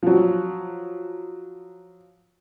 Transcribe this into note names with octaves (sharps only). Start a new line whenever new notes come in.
F3 F#3